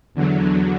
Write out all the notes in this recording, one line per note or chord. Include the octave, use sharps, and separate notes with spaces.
E2 D3 F#3